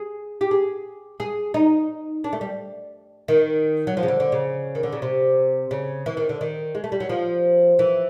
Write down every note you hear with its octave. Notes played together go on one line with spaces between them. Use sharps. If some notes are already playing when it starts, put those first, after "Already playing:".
Already playing: G#4
G4
G#4
G#4
D#4
D4
A3
G3
D#3
F#3
F3
C#3
D3
D3
C#3
D#3
D3
C#3
C3
C#3
E3
D#3
D3
D#3
G#3
A3
G3
F#3
F3
E3